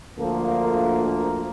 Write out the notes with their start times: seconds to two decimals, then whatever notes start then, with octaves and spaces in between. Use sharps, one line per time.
0.17 D2 D3 F3 A#3 A4
0.62 A#4
1.07 A#4